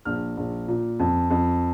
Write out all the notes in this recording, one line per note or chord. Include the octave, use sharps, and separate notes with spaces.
A#1 F6
A#1
A#2
F2
F2